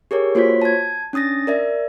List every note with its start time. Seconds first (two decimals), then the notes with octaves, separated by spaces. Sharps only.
0.11 G4 G#4 A#4 C#5
0.35 A#3 F4 F#4 C5 C#5 B6
0.62 A5 G#6
1.13 C#4 D4 D#6 A6 A#6
1.47 A#4 D5 E5